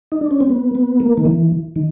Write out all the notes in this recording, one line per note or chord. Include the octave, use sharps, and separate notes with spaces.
D#4
D4
C#4
C4
B3
B3
A#3
D#3
E3
D#3